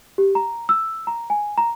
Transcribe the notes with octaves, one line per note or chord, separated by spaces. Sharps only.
G4
A#5
E6
A#5
G#5
A#5